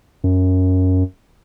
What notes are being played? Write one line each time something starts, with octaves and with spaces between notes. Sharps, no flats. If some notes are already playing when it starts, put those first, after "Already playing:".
F#2